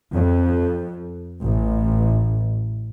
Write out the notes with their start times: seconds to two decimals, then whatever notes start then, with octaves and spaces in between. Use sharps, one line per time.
0.13 F2
1.42 A1